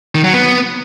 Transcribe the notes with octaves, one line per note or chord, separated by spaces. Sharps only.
D#3
F#3
B3